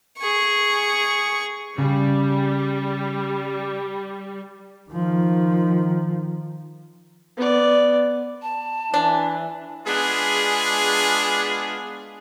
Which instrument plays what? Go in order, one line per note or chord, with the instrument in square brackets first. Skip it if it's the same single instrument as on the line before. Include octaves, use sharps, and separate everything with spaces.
[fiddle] G#4 C#6
[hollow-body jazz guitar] C#3 [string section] G3
[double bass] D#3 F3
[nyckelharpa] B3 D5
[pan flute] A5
[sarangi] E3 [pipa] D4
[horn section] G#3 B3 D4 F4 G#4